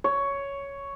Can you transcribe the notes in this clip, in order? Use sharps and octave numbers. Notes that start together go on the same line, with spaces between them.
C#5